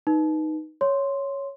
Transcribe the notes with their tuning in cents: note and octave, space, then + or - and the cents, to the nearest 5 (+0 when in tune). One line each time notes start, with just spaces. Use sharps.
D#4 +0 B4 -5
C#5 +0 C6 +0